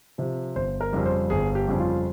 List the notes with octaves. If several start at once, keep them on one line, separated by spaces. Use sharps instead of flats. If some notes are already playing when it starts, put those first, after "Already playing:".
C3 F3
G1 C5
A#4
F2 C#3 G3
C5
G1 G#4
G4
F2 C#3 G3
F4